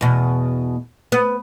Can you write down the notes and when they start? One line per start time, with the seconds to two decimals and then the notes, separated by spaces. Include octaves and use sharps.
0.01 E2 B2
1.12 B3